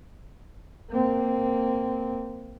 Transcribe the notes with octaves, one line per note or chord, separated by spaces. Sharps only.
A#3 C4